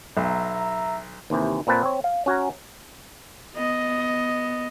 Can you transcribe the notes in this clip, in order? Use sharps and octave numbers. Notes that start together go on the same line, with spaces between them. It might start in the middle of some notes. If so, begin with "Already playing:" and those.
B1 E5 A#5
D#2 C3 E3
A#2 A#3 C4 B4 A5
C4 C#5
F5
C#4 F#4 G#5 A#5
B3 D#5